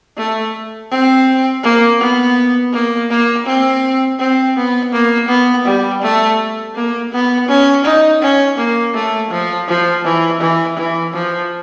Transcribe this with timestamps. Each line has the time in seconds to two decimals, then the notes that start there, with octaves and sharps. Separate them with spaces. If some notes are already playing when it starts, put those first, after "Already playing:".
0.17 A3
0.91 C4
1.63 A#3
2.01 B3
2.73 A#3
3.10 A#3
3.46 C4
4.19 C4
4.57 B3
4.92 A#3
5.29 B3
5.66 G3
6.02 A3
6.76 A#3
7.12 B3
7.48 C#4
7.85 D#4
8.22 C#4
8.58 A#3
8.94 A3
9.30 F3
9.68 F3
10.04 E3
10.41 E3
10.77 E3
11.14 F3